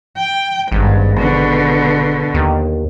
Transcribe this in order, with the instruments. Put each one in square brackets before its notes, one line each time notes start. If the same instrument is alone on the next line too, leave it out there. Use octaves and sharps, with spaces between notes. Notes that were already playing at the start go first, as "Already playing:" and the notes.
[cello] G5
[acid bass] G#1 [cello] G2
[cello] B2 D3
[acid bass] D#2